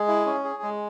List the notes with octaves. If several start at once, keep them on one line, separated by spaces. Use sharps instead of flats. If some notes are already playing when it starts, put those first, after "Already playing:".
Already playing: G#3 G#4
E4
C#4
G#4
G#3